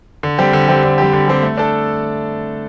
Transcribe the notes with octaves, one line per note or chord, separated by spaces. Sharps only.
D3
G3 C4 G4
D3
G3 C4 G4
D3
G3 C4 G4
D3
G3 C4 G4
A3
D4 A4